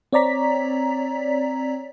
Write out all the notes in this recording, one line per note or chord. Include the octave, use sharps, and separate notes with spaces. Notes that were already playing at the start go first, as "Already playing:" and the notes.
C4 C#5 D5 A#5 B6